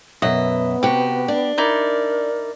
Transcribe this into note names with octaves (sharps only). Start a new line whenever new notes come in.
F#2 B2 B3 D#5 E5
C3 F#4 G4
D4
D#4 E4 A#4 D5